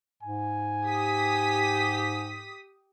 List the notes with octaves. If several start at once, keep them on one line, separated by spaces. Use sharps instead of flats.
G#2 G#5
G4 D#6 B6